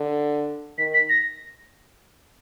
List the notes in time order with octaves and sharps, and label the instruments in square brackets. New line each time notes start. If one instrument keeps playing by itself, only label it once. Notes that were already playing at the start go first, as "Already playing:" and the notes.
Already playing: [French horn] D3
[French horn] D#3 [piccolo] B6
[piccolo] B6
A#6